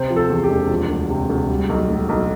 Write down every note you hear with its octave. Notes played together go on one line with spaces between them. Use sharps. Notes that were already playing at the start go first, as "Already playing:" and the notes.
Already playing: C3 C5
F3
A4
E2
G4
E1
F3
D2
C3
D2
G3
B1
A2
B1